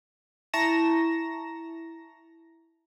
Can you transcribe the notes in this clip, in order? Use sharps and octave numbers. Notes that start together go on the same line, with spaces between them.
E4 A5 A#5 C#6 A#6 E7